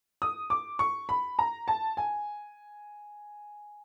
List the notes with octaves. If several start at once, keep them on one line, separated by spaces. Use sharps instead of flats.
D#6
D6
C#6
B5
A#5
A5
G#5